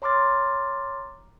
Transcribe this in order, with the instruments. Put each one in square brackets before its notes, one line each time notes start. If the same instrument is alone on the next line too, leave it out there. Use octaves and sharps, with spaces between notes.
[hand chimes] C#5 A#5 C6 D6 F6 A6